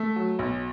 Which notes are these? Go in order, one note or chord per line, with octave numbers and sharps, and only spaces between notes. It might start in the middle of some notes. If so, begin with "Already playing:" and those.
Already playing: A3
F#3
B1